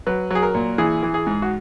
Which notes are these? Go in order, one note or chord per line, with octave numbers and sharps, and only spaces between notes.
F#3 B4
F#3 G#4
A#4
A#2
E3 G#4
E3
G#4
G#2
F#4